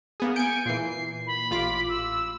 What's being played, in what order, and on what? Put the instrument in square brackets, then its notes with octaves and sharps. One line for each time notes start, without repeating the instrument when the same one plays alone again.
[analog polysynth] A#3 B3 G#4
[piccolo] G#5 [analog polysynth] G6 C#7 D7
[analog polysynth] A#2 E3 [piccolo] C7
[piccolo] B5
[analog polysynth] A1 F4 D6
[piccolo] E6